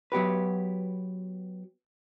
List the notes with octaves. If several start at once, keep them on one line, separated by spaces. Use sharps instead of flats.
F#3 B3 G4 B4